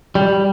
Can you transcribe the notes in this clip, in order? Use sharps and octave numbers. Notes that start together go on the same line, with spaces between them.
G3